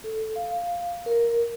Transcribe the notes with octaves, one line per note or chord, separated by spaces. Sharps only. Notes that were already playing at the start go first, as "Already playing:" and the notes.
A4
F5
A#4